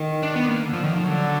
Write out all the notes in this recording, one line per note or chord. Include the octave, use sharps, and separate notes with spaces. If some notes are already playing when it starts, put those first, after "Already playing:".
Already playing: D#3
D4
B3
A#3
D3
F3
D#3
F3
D3 F#3